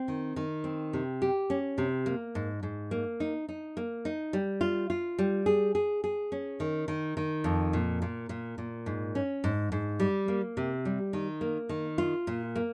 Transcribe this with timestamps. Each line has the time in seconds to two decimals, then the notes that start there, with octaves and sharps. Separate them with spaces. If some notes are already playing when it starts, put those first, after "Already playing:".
Already playing: C4
0.08 D#3
0.36 D#3
0.64 C4
0.93 C3
1.22 G4
1.50 C#4
1.78 C3
2.06 A#3
2.35 G#2
2.63 G#2
2.91 A#3
3.20 D#4
3.49 D#4
3.77 A#3
4.05 D#4
4.33 G3
4.61 F4
4.90 F4
5.19 G3
5.46 G#4
5.75 G#4
6.04 G#4
6.32 C#4
6.60 D#3
6.88 D#3
7.17 D#3
7.44 F2
7.73 A#2
8.02 A#2
8.29 A#2
8.58 A#2
8.86 G#2
9.15 C#4
9.44 G#2
9.72 G#2
10.00 G3
10.28 A#3
10.57 C3
10.85 G3
11.13 D#3
11.41 A#3
11.69 D#3
11.98 F4
12.27 A#2
12.56 A#3